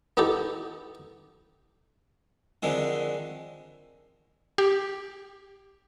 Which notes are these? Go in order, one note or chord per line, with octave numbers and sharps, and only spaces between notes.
B3 D#4 E4 G4 A4
F2 D3 D#3 G#3
G4